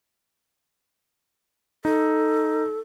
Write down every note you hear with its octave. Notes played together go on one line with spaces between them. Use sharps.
D#4 A4